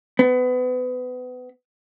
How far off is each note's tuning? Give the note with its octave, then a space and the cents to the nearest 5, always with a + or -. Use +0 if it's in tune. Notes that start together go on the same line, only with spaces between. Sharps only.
B3 +30